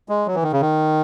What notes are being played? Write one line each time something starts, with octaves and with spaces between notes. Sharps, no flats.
G#3
F#3
E3
D#3
C#3
D#3